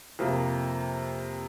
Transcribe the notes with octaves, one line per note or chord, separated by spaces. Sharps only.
F2 C3 F3 A#3